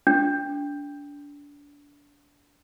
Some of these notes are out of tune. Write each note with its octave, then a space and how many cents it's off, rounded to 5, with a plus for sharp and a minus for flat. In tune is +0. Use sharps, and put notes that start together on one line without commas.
D4 -25